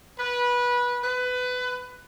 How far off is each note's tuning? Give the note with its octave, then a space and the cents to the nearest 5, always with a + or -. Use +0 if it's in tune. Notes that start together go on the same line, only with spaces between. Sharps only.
B4 -20
B4 +20